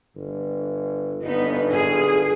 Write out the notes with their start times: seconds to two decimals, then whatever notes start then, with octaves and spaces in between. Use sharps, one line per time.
0.16 G1
1.22 G1 B3 D#4
1.73 G#4